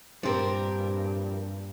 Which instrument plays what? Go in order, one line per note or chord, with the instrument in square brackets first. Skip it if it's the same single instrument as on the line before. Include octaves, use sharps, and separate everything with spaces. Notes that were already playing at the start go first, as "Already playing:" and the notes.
[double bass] G2 A#2 [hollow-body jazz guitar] F3 C4 [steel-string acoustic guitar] D4 G4 A#4